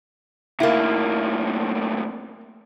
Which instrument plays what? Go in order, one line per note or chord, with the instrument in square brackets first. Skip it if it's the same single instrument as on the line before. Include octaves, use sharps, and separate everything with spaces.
[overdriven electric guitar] D#2 A2 [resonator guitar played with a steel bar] A#3 E4